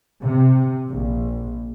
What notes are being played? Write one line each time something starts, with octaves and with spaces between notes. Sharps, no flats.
C3
A#1